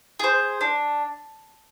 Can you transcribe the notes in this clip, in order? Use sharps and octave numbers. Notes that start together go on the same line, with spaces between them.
G#4 C5
D4